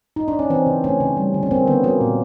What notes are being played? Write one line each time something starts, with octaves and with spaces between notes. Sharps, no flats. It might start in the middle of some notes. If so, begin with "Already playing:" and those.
D#4
D4
C#4
E3 C4
C#3
A3 C#4
C#3
G3
D3
C#4
A#3 C4
D3 B3
F#3 A#3
A#2